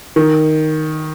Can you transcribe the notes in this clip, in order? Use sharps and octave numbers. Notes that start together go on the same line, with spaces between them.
D#3